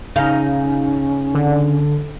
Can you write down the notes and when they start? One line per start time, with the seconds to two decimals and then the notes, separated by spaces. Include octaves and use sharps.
0.16 C#3 C#4 D#4 F5
1.35 D3